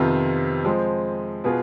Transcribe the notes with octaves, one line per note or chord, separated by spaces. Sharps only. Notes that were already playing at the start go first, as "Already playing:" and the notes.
Already playing: F2 C3 D#3 B3 F4
F3 G#3 C4
B2 B3 F4 G#4